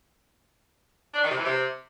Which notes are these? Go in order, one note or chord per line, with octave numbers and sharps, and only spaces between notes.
D4
D#3
C3
E3
C3